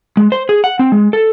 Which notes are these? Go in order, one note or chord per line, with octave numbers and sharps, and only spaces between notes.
G#3
C5
G#4
F#5
C4
G#3
A4